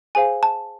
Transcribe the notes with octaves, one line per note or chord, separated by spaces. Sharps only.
G#4 C5 F5 G#5
A5